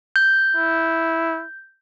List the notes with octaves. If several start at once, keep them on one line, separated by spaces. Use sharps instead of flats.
G6
E4